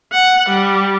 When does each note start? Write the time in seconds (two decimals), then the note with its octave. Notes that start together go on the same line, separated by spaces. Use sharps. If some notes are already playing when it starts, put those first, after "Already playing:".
0.13 F#5
0.50 G3